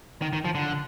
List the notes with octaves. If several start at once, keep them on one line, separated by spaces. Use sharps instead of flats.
D#3
D#3
F3
D3